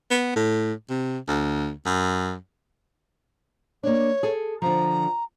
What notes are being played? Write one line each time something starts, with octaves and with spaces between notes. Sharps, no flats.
B3
A2
C3
D2
F#2
A#3 D4 C#5
G#4 A4
D3 F3 A#5